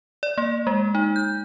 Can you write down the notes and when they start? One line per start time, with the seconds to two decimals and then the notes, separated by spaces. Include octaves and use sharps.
0.23 D5
0.38 A#3
0.67 G#3
0.95 D#4
1.16 G6